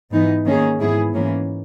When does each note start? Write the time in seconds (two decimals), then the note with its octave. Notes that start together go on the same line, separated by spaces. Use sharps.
0.11 G#2 E3 B3 D#4
0.45 D#3 A#3 C#4 G#4
0.80 G#2 E3 B3 E4 G#4
1.14 G#2 E3 A#3 C#4